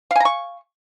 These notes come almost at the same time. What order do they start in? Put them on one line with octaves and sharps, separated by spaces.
F5 G#5 A#5 C#6